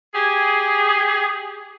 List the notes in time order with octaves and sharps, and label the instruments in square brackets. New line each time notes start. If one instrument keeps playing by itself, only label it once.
[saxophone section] G4 G#4